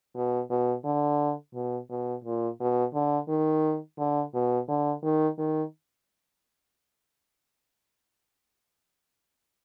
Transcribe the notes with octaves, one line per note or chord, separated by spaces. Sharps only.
B2
B2
D3
B2
B2
A#2
B2
D3
D#3
D3
B2
D3
D#3
D#3